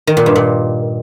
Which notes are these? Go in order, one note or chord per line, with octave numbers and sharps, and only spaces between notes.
D#3
A#2
G2
A#2